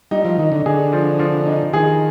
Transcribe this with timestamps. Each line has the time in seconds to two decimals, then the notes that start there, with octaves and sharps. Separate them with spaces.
0.11 G3 D#4
0.25 F3
0.38 D#3 D#4
0.52 D3
0.66 D3 G#4
0.93 F3
1.19 F3
1.46 D#4
1.73 D#3 G#4